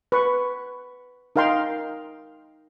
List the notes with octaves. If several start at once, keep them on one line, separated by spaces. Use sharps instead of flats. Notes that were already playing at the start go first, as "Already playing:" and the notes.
B4 C#6
D#4 A#4 F5 G5 C6